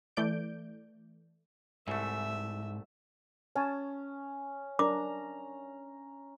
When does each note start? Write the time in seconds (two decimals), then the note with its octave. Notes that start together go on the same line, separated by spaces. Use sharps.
0.17 E3 A3 D5 G6 D7
1.88 C2 G#2 A3 E5
3.56 C#4 C#5 G#5 A5
4.79 D4 A#4 A#5 D6